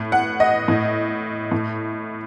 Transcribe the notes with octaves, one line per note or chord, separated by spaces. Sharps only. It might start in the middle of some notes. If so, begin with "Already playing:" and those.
Already playing: A2
F#5
D#5
A2
A2